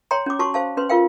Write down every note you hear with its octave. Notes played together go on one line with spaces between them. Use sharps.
C#5 G5 A#5 C6
C#4 D6
F#4 A5 C6 C#6
C5 F5 A5
C#4 B4 C6
F4 A#4 F5 G5